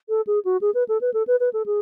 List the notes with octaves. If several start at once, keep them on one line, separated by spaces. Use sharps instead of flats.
A4
G#4
F#4
G#4
B4
A4
B4
A4
B4
B4
A4
G#4